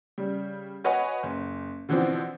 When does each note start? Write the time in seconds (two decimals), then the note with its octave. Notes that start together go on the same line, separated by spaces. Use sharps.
0.18 C#3 G3
0.84 F#4 B4 C#5 D#5 F#5 G#5
1.23 F#1
1.89 B2 D3 E3 F3 B3 C4